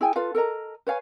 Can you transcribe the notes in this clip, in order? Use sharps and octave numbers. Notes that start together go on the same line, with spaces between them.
E4 G#4 G5 G#5
F4 A4 B4 F5
A4 A#4 D#5 A#5
B4 C#5 F5 G#5